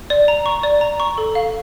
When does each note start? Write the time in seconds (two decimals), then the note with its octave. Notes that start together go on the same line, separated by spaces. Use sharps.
0.10 D5
0.28 A#5
0.46 C#6
0.63 D5
0.81 A#5
1.00 C#6
1.18 A4
1.35 F5